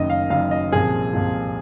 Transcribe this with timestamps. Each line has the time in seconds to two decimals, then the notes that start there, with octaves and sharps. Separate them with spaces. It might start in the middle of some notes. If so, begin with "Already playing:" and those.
Already playing: F#1 F#2 D#3 D#5
0.10 F5
0.30 F#1 F#2 D#3 F5
0.51 D#5
0.72 C2 A#2 F3 G#4
1.13 C2 A#2 F3